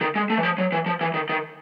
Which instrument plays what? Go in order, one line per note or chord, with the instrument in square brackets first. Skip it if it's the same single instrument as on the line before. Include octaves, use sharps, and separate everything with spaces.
[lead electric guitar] D#3
G#3
A3
E3
F3
F#3
E3
F3
E3
D#3
D#3